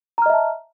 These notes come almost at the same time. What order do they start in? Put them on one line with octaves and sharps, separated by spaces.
A#5 F6 D#5 E5 A5